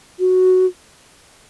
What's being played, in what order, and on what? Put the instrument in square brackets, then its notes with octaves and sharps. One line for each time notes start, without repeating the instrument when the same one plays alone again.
[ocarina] F#4